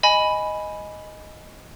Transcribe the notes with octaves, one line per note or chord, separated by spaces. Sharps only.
D#5 G#5 B5